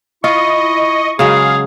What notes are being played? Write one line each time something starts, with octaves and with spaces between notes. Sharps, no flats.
E4 F4 D#5 C#6
C#3 F#3 G#3 G#4 F5